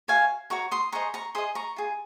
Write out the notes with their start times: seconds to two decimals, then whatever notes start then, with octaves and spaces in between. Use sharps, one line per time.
0.08 F#4 C#5 F5 G#5
0.50 F#4 C#5 A#5 C#6
0.71 C6 D#6
0.92 G#4 C5 D#5 A#5 C#6
1.14 A#5 C#6
1.35 G#4 C5 D#5 C6 D#6
1.55 A#5 C#6
1.76 F4 G#4